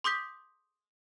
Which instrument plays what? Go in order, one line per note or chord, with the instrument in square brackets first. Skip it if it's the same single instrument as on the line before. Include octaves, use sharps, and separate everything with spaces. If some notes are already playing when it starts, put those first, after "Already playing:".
[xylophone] C6 D6 D#6 G6 B6